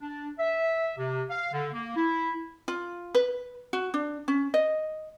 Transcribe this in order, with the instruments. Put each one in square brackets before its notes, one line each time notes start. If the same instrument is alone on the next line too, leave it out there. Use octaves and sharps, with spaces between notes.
[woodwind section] D4
E5
C3
F5
D3
A#3
E4
[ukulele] F4
B4
F#4
D4
C#4
D#5